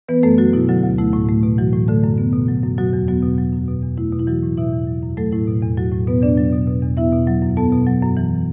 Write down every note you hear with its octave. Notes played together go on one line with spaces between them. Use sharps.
E3 B3 B4
F#2 A3 A4
F#3 A3 F#4
B2 E4
D3 F#3 F#4
D2
A3 E4
A2
A3
B2
E3 F#3 F#4
A2
D3 A3 A4
F#2
B3
B2
F#3
F#2
B2 F#3 F#4
E2
F#3 B3 F#4
B2
F#3
F#2
B2
E2
A3 E4
B2
E4
E3 F#3 F#4
A2
B2 E4 E5
E2
F#3
F#2
F#3 A3 A4
A2 E4
B2
E2
F#3 F#4
A2
B2 B3 B4
E2 D4 D5
F#3
B2
B2
E2
B3 E4 E5
B2
F#3
F#2
B3 A4 A5
B2
F#3
F#2
E3